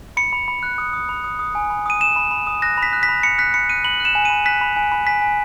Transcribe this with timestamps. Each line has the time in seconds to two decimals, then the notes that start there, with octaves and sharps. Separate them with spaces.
0.17 B5 C#7
0.33 B5
0.48 B5
0.63 F#6
0.78 D#6
0.93 D#6
1.09 B5
1.24 D#6
1.39 D#6
1.55 G#5
1.70 B5
1.86 D#6 D#7
2.01 D#6 E7
2.16 B5
2.31 B5
2.47 D#6
2.62 F#6 A#6
2.77 B5
2.83 B6
2.93 F#6
3.03 B6
3.09 B5
3.23 B5 C#7
3.38 F#6 B6
3.54 B5 C#7
3.69 F#6 D#7
3.84 B5 F#7
4.00 F#6
4.05 E7
4.15 G#5
4.25 B5 D#7
4.46 F#6 B6
4.61 B5
4.77 G#5
4.92 B5
5.07 G#5 B6
5.22 G#5